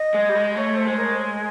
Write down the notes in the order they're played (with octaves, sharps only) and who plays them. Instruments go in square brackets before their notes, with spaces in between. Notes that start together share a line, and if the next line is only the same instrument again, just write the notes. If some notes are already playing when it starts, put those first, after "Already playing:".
Already playing: [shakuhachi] D#5
[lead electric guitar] G#3
G3
G#3
[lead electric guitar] A3 [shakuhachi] C#5
[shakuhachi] C5
[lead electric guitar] G#3
[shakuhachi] A#4